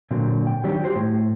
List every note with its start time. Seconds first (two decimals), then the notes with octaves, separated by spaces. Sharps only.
0.11 A#2 D3 F#3 C4
0.47 G5
0.64 D#3 F#3 G3 C4 D4 G4
0.83 F#4 G4 C5
0.96 A2